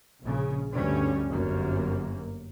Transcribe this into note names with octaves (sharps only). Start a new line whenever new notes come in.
A#1 C#3
D2 G2 G3 C#4
G1 F#2 A#3